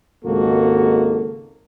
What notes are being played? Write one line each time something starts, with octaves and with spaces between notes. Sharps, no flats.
G#1 C#2 G#2 A#3 F#4 A4